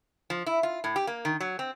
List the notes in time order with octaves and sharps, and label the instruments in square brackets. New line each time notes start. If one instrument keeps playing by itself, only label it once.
[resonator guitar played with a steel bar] F3
E4
F4
A2
G4
A#3
D#3
F#3
C4